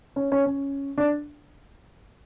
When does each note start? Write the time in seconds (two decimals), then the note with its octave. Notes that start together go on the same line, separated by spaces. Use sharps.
0.16 C#4
0.32 C#4
0.46 C#4
0.98 D4